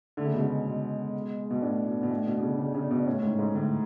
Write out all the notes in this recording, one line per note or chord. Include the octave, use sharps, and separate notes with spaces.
D3 A3
C#3
B2
C#3 G#3
B2
B2
A2 D4
B2
B2
A2
B2
B2
C#3
C#3
C#3
B2
A2 C#4
A2
G#2
G#2
A2 D3